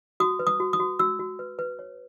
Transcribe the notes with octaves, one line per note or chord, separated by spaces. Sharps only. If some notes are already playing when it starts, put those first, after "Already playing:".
F#4 D#6
B4
D#6
F#4
D#6
F#4
F#4 E6
F#4
B4
B4
C#5